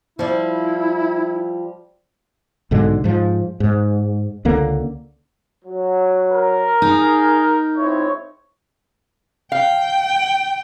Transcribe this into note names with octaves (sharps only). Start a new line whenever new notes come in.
F3 G3 E4
B1 G#2 D3 G#3
G#2 F3
G#2
C#2 D3 A#3
F#3
A#4
D#4 G#4
C#2 C4 E4 C#5
F5 G5